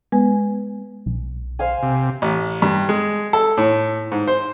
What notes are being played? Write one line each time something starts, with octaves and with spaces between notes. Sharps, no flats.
G#3 B3 B4 G#5
B1
C5 F5 G#5
C3
A1
G2
G#3
A4
A2
G#2
C5